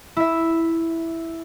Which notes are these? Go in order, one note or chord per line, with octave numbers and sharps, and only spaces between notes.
E4 E5